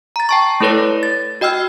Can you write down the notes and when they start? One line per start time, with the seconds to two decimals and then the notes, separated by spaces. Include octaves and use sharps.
0.16 A#5 A6
0.29 G5 A5 C#6
0.60 A3 E4 A4 B4 C#5 A#6
1.03 A6
1.41 F#4 D#5 G5 E6 F6